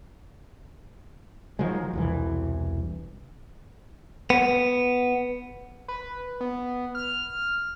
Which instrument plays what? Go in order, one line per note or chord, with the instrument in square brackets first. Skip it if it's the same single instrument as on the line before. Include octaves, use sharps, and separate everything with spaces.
[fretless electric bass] D#3 F3 F#3 G#3
E1 C2 E3
[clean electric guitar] B3
[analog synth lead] B4
B3
F6